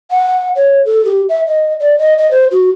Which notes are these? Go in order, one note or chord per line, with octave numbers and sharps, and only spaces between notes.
F#5
C#5
A4
G4
E5
D#5
D5
D#5
D#5
C5
F#4